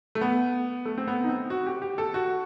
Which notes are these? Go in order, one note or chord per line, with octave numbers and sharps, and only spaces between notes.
A3
B3
A3
C4
B3
D#4
C4
F#4
G4
G4
A4
F#4